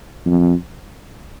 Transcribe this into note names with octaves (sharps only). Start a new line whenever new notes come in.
F2